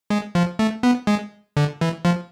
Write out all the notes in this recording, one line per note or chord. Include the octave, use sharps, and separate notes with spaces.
G#3
F3
A3
B3
G#3
D3
E3
F3